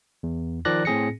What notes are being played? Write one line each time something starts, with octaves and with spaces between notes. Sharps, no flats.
E2
D#3 F3 D5 F#6 A#6
A2 C4 G#4 A#6 C#7